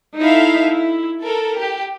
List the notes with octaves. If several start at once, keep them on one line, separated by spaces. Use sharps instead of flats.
D#4 E4 A4 E5 F5
E4
A4 A#4
G4